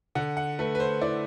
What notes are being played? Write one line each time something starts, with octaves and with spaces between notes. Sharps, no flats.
D3 F#5
F#5
A3 B4
B4
C5
E4 D5